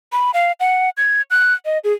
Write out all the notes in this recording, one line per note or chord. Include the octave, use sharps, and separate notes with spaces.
B5
F5
F#5
G#6
F#6
D#5
G#4